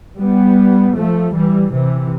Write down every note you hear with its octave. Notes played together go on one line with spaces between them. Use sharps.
G3 B3
F3 A3
E3 G3
C3 E3